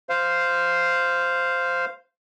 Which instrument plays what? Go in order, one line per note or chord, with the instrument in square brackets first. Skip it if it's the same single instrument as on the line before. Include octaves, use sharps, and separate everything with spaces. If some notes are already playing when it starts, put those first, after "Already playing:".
[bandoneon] C5 F5